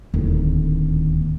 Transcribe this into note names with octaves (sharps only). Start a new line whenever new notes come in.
D1 D#2